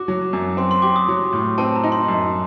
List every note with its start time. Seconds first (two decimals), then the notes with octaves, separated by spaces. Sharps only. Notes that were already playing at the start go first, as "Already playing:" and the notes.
Already playing: F#4 D6
0.08 F#3
0.33 F#2
0.57 C4 C6
0.71 C6
0.82 G4 D6
0.96 D#6
1.08 F#3
1.33 A2
1.58 C4 A5
1.76 A#5
1.84 D#4
1.92 C6
2.08 F#2